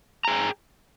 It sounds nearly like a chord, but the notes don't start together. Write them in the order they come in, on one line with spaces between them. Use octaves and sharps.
A#5 G#4 G5